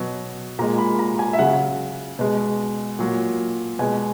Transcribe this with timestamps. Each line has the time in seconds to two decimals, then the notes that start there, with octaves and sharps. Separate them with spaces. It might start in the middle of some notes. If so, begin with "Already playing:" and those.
Already playing: B2 F#3
0.59 A#2 G#3 A#5
0.78 B5
0.99 A#5
1.19 G#5
1.33 E5
1.39 C#3 F#3 F#5
2.19 B2 G#3
2.99 A#2 F#3
3.79 B2 G#3 G#5